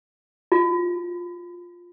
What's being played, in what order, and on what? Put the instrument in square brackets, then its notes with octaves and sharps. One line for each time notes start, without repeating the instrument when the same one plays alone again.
[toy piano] F4